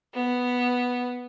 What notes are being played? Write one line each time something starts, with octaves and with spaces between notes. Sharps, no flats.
B3